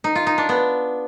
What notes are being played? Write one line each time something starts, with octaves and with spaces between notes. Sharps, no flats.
D#4
F4
D#4
D4
B3